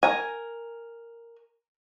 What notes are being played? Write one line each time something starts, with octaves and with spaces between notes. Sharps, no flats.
A#4 G#5